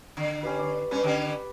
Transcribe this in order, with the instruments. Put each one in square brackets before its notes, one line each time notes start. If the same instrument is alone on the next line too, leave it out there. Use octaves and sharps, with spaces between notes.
[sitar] D3
[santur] C#4 G4 B4
D5 C#6
[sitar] G2 C#4 [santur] B4
[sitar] D3 C#4 G4